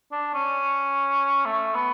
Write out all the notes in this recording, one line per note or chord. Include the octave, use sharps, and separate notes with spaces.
D4
C#4
A3
B3